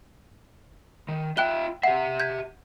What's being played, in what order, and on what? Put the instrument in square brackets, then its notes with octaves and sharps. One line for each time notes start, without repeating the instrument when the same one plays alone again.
[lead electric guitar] D#3
[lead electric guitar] F4 E5 [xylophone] G5 F#6 G7
[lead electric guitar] G4 E5 [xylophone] F#5
[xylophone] G6 G#6 B6